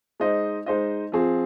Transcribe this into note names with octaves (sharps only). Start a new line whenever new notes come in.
G#3 D#4 C5 D#5
G#3 D#4 C5 D#5
F3 C4 G#4